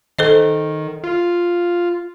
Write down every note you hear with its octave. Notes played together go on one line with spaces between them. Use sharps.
D#3 A4 C5 D#5
F4